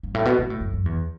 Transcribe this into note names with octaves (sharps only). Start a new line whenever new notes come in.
G2
A2
B2
B2
A2
F#2
F#2
E2